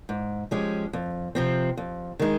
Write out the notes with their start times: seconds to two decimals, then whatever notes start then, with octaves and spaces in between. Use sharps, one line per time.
0.09 G#2
0.51 F3 G#3 C#4 G4
0.93 F2
1.35 C3 F3 C4
1.77 F2
2.19 D#3 G#3 D#4